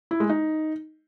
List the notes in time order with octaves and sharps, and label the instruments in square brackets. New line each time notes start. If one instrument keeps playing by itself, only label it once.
[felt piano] E4
G#3
D#4